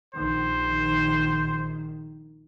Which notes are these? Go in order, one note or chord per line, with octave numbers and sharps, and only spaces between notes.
A#1 D#3 C5